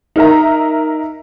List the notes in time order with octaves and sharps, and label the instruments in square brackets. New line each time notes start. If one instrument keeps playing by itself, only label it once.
[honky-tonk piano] D#4 A#4 E5 A#5